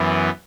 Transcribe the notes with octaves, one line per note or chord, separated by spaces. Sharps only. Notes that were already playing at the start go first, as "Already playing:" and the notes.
Already playing: F#2 E3 B3